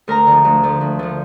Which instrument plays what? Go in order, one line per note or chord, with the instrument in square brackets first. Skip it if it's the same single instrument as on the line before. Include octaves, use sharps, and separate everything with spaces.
[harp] D2 A#4 A#5
D3 F3
D2
D3 F3
D2
D3 F3